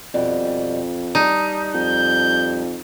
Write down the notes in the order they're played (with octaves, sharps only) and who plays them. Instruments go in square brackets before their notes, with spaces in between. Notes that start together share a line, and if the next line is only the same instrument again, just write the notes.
[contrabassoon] F2 [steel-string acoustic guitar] B2 G3
[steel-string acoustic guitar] G3 A5 [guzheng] D#4
[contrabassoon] F2 [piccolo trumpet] G6